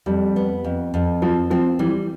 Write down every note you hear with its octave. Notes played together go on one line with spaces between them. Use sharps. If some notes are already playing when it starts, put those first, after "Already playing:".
F2 G3
B3
F2
F2
F3 C4
F3 C4
E3 G3